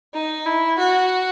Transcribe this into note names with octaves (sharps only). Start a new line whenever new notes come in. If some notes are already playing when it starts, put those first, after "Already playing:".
D#4
E4
F#4